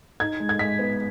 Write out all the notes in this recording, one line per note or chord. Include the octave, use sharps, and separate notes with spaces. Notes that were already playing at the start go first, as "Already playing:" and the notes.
D#4 G#6
G#3
G#6
G#3 B6
B3